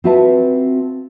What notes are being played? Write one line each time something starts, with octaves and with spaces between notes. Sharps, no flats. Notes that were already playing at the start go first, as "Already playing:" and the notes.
C4 F4 F#4 B4 E5 A5